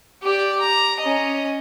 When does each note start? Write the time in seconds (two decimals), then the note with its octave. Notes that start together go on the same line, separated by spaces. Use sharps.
0.22 G4 D5
0.60 A#5
1.00 C#4 D#5